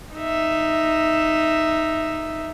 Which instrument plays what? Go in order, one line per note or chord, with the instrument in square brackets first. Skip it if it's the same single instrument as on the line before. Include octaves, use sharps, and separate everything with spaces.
[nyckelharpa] D#4 E5